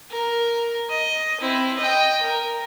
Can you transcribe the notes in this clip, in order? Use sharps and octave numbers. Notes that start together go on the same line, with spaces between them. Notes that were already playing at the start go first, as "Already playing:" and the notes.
A#4
D#5
C4 E4
D#5 G5
A#4